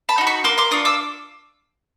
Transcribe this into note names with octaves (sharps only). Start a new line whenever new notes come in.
A5 B5
D#4 F#4
B5 C#6
A#3 C6 D6
C6 D6
D4 F4 C#6 D#6
D6 E6